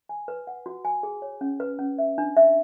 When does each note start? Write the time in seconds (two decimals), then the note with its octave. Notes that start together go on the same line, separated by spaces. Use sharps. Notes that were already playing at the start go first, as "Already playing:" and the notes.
0.09 G#5
0.28 B4
0.47 F#5
0.66 F#4
0.85 G#5
1.03 G#4
1.22 C#5
1.41 C#4
1.60 B4
1.79 C#4
1.98 E5
2.18 D4
2.37 E5